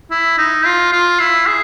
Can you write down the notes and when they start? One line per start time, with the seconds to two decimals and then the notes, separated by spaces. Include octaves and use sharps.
0.11 E4
0.38 D#4
0.65 F4
0.92 F4
1.20 E4
1.46 G#4